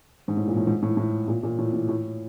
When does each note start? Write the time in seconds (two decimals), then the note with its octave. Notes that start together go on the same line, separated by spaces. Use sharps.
0.28 G#2
0.37 A2
0.47 A#2
0.57 A2
0.67 G#2
0.82 A2
0.97 A2
1.28 A#2
1.43 A#2
1.58 A2
1.73 A2
1.88 A2